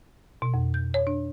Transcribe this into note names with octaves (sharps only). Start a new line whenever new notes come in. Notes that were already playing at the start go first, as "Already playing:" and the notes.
B2
F2
G6
C#5
D4